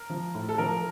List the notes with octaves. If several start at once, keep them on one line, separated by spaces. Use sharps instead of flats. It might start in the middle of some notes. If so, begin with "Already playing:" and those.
Already playing: A#4
F3
A2
A4
F3 A#4